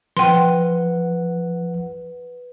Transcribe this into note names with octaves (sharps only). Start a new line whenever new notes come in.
F3 B4 F#5 G5 C6